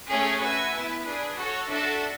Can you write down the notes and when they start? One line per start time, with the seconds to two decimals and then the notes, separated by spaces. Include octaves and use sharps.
0.09 A3 C#4 G#4 C#5 E5
0.42 F#4 B4 E5 G#5
0.74 B3 E4 B4 E5
1.05 D4 G#4 B4
1.37 F#4 A4 C#5 F#5
1.70 D4 F#4 A4 E5 A5